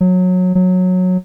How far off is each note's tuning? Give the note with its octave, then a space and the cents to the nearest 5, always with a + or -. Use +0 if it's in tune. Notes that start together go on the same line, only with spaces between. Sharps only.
F#3 -20
F#3 -15